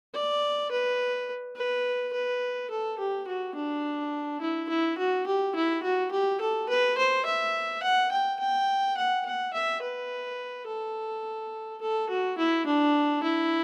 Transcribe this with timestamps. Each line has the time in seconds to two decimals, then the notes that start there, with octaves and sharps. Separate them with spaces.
0.14 D5
0.71 B4
1.57 B4
2.13 B4
2.70 A4
2.99 G4
3.28 F#4
3.55 D4
4.41 E4
4.69 E4
4.98 F#4
5.27 G4
5.55 E4
5.83 F#4
6.11 G4
6.41 A4
6.69 B4
6.98 C5
7.26 E5
7.83 F#5
8.11 G5
8.40 G5
8.97 F#5
9.25 F#5
9.54 E5
9.82 B4
10.67 A4
11.82 A4
12.09 F#4
12.38 E4
12.66 D4
13.23 E4